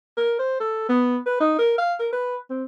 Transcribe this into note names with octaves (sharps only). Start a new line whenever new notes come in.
A#4
C5
A4
B3
B4
D#4
A#4
F5
A#4
B4
C4